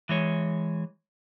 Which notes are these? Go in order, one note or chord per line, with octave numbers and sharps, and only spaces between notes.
E3 G#3 C#5